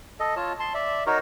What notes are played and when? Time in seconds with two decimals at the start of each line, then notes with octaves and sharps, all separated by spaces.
0.20 A4 D#5
0.36 F4 C#5 A5
0.60 A5 C6
0.74 D5 E5
1.06 D#4 F#4 A#4 C#5